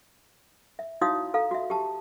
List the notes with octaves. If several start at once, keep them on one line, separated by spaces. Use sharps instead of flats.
E5
D#4 E4 F#4 C#5 F5 D#6
A4 F5 A#5
F#4 E5
G4 A5